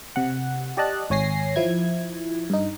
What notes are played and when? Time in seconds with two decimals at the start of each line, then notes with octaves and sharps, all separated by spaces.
0.16 C3 F#5
0.77 G4 D5 D#5 A5 F#6
1.10 G#1 C#5 G#5 A#6 C7
1.56 F3 E4 G#6
2.50 G2 D#4